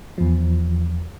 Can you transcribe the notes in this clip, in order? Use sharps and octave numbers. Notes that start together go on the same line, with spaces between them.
E2 F3